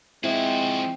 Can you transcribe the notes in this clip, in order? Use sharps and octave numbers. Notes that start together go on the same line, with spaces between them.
F3 G#3 C4 E4 F#4